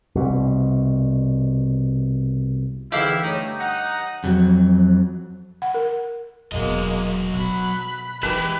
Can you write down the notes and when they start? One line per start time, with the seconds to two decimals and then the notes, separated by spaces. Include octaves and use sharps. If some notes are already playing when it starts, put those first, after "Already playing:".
0.15 C2 B2
2.92 E2 G#2 D3 E4 G4 F5
3.23 G2 A3 D#4 C#5
3.60 D#4 F#5
4.24 F2 F#3
5.62 F#5
5.74 A#4
6.52 E1 B2 F#3 G#3 A#3 D#5
7.34 B2 B5 F#6
8.23 E3 G#3 D#4 E4 G4 B4